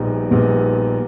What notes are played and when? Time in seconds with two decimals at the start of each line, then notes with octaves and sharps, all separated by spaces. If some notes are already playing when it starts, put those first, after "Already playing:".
Already playing: A#1 A#2 G3 B3 D#4
0.31 A#1 A#2 G3 B3 D#4